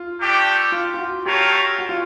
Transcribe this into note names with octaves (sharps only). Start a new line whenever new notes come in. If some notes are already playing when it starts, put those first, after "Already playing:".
Already playing: F4
A3 D4 G4
F4
F4
F#4
A3 C4 F4 G4 A#4 C#5
F#4
F4